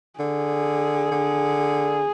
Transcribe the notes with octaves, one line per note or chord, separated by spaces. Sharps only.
D3 G#4
D3